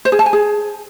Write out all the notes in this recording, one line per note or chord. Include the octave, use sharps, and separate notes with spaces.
C5
G#4
A5
G#5
G#4